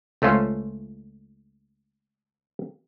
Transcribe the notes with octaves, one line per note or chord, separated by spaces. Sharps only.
C#2 A3 C#4 F4 C5 C#5